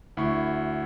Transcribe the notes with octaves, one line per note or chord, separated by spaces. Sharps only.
D2 E4 C#6